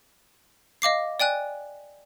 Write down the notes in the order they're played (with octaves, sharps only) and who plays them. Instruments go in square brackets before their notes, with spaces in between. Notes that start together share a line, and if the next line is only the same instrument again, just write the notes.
[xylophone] D#5 F5 D6 C7
D5 G5 G#5 F#6